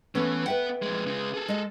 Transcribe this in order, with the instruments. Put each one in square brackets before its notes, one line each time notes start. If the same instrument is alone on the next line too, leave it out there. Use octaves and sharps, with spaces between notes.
[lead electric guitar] E3 [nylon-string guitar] A3 B3 C#4
[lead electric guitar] B3 F#5 [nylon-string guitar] B4 E5 G5
[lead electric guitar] F2 G#3
C#3 G#3
G#4 A4
[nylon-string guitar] G#3 D#5